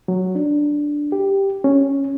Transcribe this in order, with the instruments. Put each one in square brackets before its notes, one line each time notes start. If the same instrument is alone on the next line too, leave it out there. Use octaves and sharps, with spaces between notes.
[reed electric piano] F#3
D4
G4
C#4